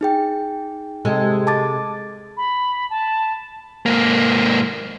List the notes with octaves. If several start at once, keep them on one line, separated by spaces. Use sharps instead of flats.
D#4 G#4 G5
C3 G#3 A4
A5 D6 A6
B5
A5
G#2 A#3